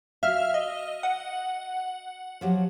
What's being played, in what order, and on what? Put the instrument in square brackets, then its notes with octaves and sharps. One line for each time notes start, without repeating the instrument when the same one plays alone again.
[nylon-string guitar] F#4 F5 [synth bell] E5 F6
[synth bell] D#5
F#5
[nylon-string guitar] F3 F#3 G4